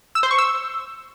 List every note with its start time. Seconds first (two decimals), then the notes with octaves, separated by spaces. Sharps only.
0.15 E6
0.23 C5
0.31 C#6
0.38 E6